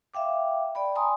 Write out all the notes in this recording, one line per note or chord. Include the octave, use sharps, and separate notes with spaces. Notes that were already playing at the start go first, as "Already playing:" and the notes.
E5 F5 G5 D6
D5 G5 B5
G#5 A#5 C6 D#6